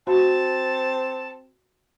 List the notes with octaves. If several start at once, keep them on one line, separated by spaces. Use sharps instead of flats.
C4 F#4 F5 A5 B5